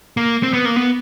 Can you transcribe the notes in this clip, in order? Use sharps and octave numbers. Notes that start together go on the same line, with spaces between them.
A#3
C4
B3
A#3
B3